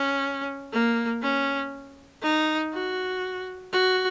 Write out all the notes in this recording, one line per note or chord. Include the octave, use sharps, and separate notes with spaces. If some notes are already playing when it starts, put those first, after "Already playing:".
Already playing: C#4
A#3
C#4
D#4
F#4
F#4